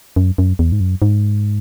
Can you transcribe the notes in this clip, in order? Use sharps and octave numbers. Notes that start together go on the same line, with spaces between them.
F#2
F#2
E2
G#2
F#2
G#2